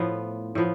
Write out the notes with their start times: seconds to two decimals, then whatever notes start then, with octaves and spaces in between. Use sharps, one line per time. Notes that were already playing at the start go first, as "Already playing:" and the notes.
Already playing: A2 F3 B3
0.55 A2 F3 B3